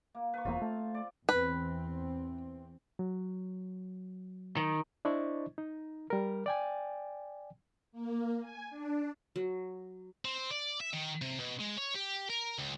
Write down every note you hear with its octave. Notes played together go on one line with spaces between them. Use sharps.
A#3
B4 C#6
F1 E2 A#3 C4 F4
A3
D5
E2 E3 C4 B4
F#3
D#3
D4 E4 C5 D5 D#5 C#6
D#4
G3 A#4
D5 G5 G#5
A#3
G#5
D4
F#3
C4
D5
E5
D#3
C3
B2
G#3
C#5
G4
A#4
C#2